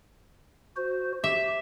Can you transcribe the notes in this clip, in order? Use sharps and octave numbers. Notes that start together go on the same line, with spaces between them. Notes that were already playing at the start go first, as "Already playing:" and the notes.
F#4 C5
G4 E5